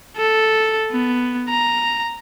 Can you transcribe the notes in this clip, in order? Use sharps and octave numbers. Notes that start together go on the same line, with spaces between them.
A4
B3
A#5